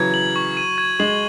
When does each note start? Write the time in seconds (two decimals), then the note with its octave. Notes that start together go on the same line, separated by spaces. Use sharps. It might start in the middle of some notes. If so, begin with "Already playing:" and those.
Already playing: C#3 E3 F#3 G#6
0.14 F#7
0.36 C#6
0.57 D#7
0.78 G#6
0.99 G#3 F#7